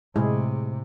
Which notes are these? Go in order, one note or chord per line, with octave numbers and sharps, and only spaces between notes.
A2 C3 G#3 E4 G#4